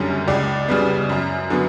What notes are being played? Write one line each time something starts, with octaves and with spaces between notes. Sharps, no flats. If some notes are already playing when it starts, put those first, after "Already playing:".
Already playing: F#1 F#2 D3 G3 C#4
C#2 D5
C#3 G3 B3
F#2
D3 F#3 B3